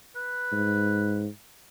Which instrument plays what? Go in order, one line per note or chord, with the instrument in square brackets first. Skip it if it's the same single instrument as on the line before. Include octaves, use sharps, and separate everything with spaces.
[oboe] B4
[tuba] G#2